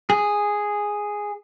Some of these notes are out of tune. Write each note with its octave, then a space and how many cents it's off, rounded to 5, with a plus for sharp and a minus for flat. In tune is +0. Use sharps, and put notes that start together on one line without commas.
G#4 -5